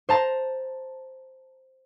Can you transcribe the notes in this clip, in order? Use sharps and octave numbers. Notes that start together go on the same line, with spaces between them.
C5 A5 A#5